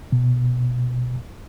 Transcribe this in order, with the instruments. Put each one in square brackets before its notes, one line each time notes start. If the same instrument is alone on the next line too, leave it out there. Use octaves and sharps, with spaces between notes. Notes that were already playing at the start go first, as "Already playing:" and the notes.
[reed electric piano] B2